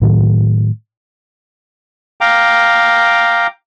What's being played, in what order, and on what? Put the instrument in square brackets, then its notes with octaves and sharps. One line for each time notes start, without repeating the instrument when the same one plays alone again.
[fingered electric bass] A2 D#3 F#3
[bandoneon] F5 G5 A#5 D6